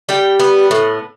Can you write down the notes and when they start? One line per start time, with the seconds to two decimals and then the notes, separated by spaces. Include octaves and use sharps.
0.09 G3 G4 G5
0.39 B3
0.71 A2